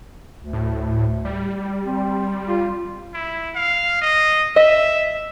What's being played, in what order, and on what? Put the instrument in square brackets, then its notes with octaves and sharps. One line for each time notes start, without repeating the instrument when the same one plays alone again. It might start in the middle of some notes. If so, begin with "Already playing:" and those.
[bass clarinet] D2
[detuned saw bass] A2
G3
[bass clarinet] C4
F4
[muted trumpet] E4
F5
D#5
[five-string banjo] D#5 [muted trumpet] E5